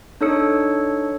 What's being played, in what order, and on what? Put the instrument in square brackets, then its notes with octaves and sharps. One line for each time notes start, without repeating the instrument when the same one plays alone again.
[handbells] D4 D#4 A4 C#5 E6 C#7